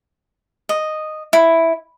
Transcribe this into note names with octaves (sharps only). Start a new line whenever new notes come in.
D#5
E4